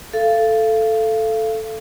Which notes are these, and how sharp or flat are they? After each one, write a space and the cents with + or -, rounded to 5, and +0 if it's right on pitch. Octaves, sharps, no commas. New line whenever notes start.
A4 +0 F5 -30